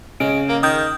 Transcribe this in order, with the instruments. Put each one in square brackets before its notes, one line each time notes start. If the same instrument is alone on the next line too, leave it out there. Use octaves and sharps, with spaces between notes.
[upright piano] C#3 C#4 [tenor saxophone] G#3 [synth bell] D7
[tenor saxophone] A#3
[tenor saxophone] D#3 [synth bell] D#6 G6